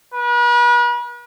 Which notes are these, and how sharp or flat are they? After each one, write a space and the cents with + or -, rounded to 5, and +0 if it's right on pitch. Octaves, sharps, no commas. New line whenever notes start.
B4 -40